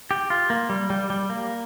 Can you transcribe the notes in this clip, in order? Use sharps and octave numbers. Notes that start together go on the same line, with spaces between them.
G4
F4
A#3
G3
G3
G3
A#3